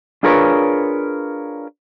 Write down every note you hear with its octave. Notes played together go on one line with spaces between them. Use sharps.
D4 F4 G#4 A#4 B4 C#5